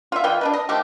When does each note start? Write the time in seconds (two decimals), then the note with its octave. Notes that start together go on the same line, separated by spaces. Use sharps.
0.12 F4 E5
0.24 E3 F4 D#5 G5
0.41 D4 D#4 B4
0.53 D#5
0.69 D#3 F3 A3 G4